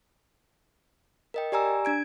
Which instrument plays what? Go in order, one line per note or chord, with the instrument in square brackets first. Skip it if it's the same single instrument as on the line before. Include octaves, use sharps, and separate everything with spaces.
[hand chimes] A#4 D#5 G5
G4 D5 G#5 A#5 E6
D4 G#6 D7